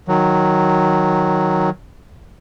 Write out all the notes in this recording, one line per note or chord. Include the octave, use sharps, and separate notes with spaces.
D#3 F#3